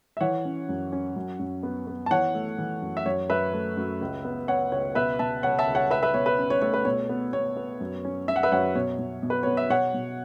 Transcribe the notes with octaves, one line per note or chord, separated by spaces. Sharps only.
E5
E3 C#5 F#5
C#4
F#2
C#4
F#2
F#2
B3
B3
A5
E3 C#5 F#5
A3
E3
F#2
E5
F#2 C#5
F#2 B4 E5
A3
F#2
C#2
B3
B3 C#5 F#5
C#2 C#5
B2 B4 E5
B2 E5 A5
C#2 C#5 F#5
E5 A5
C#2
C#5 F#5
C#2 B4 E5
B4 E5
B2 C#5
B4 E5
C#4
C#5
A3 C#5
B4
B2 C#5
B3
B3 C#5
B3
F#2
C#4
C#4 E5
F#5
B4 E5
F#2 C#5 F#5
B2 C#5
B2
B2
B4
B3 C#5
E5
B2 C#5 F#5
B2